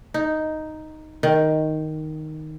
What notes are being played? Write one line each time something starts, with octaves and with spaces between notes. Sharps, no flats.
D#4
D#3